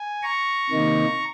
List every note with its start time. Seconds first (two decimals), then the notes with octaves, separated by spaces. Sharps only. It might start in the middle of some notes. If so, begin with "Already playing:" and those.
Already playing: G#5
0.22 A#5 C#6
0.70 C3 D#3 A#3 D#4